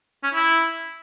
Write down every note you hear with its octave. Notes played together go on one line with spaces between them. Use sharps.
C#4
E4